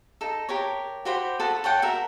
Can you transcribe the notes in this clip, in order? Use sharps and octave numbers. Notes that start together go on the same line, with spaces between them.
D#4 A4
G4 A#4 C#5
F#4 G4 C5 B5
F#4 A4 B4 D#6
A4 C#5 F#5 G5
F#4 A#4 E5